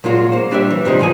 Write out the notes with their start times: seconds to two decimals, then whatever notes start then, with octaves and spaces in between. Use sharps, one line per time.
0.04 A#2 F#3 G#3 F4 F#4
0.32 A#3 C5
0.51 G3 D4 G4 C#5 E5
0.71 E3
0.85 G#2 C3 F3 G3 G#3
0.99 B1 E3 F4 G#4 C5 G#5